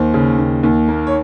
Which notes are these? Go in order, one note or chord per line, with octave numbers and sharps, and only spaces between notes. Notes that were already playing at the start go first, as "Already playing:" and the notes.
Already playing: D#2 C5
C#3
D#2
D#2
A#3
C#5